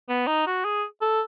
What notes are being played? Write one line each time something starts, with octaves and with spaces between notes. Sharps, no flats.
B3
D#4
F#4
G#4
A4